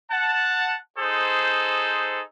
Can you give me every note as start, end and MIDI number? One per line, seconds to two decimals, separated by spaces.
0.11 0.75 78
0.11 0.75 81
0.98 2.21 63
0.98 2.21 68
0.98 2.21 69
0.98 2.21 72